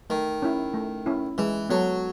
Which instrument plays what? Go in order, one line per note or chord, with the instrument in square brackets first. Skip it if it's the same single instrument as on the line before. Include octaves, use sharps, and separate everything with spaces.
[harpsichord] D#3 [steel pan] A3
[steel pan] C#4 E4
A3
C#4 E4
[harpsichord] E3 [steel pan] G#3
[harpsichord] F#3 [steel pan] B3 F#4 A4